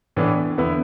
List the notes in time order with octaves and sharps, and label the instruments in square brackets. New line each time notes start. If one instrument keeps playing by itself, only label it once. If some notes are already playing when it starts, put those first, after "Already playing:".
[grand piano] A2 E3 B3 D4
E2 D3 B3 E4